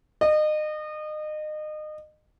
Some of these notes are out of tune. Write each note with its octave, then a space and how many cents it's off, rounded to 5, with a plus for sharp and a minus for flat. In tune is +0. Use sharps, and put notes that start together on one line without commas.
D#5 -30